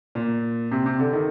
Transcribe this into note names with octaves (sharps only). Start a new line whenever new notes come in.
A#2
C3
C3
D3
D#3